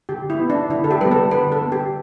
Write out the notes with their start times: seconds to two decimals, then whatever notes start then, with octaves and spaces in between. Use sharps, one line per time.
0.09 D3 G4
0.30 E4
0.39 B3
0.50 D4
0.70 D3 E4
0.84 A4
0.91 G4
1.01 G3 B3 B4
1.11 A4
1.31 D3 B4
1.52 A4
1.61 B3
1.72 G4